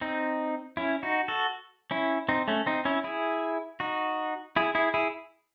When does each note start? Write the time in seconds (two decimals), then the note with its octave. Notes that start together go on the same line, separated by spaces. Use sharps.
0.01 C4 D#4
0.77 C#4 E4
1.03 D#4 F#4
1.28 F#4 A4
1.91 C#4 E4
2.29 C4 D#4
2.48 A3 C#4
2.66 C4 D#4
2.85 C#4 E4
3.04 E4 G#4
3.80 D#4 F#4
4.56 E4 G#4
4.75 E4 G#4
4.94 E4 G#4